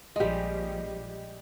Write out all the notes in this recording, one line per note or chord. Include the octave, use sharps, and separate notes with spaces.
A#1 F3 G3 G#3 G4 D#5